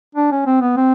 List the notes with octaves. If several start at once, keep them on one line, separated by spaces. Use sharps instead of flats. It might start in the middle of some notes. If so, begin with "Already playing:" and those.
D4
C#4
C4
B3
C4